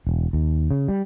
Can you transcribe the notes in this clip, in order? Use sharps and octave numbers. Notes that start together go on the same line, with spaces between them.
E1
D#2
C#3
G3